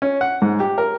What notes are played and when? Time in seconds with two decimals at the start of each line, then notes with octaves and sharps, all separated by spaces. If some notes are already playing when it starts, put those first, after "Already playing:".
0.02 C#4
0.21 F#5
0.42 G#2
0.60 G4
0.78 A#4